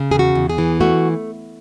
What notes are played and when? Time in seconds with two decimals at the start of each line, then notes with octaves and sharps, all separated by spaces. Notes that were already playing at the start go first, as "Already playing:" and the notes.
Already playing: C#3
0.11 E2 G#4
0.19 F#4
0.35 E2
0.49 G#4
0.58 E3
0.80 A3 F#4